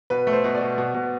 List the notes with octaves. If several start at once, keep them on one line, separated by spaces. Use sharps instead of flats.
B2 B4
A3
C5
B2
D5
B2
B2
B2